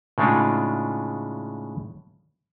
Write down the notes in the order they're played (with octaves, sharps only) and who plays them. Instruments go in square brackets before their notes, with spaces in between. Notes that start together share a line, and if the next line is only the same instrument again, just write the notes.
[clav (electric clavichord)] A2 C#3 G#3 D4 D#4 F4